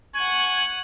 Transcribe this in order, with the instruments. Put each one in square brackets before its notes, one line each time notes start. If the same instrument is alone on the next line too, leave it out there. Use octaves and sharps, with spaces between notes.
[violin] F#5 F#6 [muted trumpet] G#5 [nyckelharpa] C#6